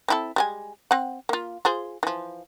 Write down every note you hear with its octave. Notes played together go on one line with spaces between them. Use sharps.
C4 E4 A4
G3 G#3 G#5
C4 F#5
A#3 F4
F4 G#4 C5
E3 F3